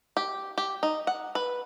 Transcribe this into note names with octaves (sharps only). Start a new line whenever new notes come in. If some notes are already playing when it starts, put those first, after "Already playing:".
G4
G4
D#4
F#5
B4